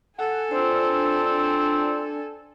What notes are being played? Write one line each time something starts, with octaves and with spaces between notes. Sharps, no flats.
A4 F#5 G#5
C4 D4 F4 C5